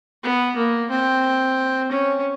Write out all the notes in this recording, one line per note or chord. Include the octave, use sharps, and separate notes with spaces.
B3
A#3
C4
C#4